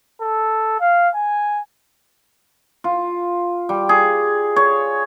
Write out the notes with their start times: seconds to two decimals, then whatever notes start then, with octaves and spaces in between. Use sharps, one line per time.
0.21 A4
0.80 F5
1.15 G#5
2.84 F4
3.69 G3
3.89 G#4
4.56 C#5